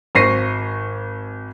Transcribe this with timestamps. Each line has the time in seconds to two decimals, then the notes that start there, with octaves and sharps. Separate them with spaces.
0.15 G#1 C5 C#6 A#6 C7 D#7